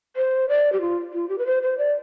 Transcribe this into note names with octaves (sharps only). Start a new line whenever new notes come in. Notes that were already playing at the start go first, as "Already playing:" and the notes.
C5
D5
G4
F4
F4
G4
B4
C5
C5
D5